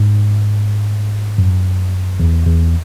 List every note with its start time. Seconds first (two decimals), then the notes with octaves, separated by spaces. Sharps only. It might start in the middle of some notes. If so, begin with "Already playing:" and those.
Already playing: G#2
1.38 F#2
2.20 E2
2.46 E2